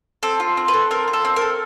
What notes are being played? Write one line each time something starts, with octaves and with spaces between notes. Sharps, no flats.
C4 A4
F4
C4
B4
A4
C4 A#4
F4
A4
C4
A#4
A4